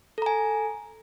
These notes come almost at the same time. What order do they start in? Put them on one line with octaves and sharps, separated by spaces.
A4 A#5 G#5